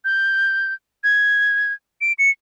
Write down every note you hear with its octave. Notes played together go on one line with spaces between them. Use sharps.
G6
G#6
D7
C#7